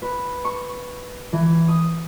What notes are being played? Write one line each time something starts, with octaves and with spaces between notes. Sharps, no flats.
B4
C#6
E3
D#6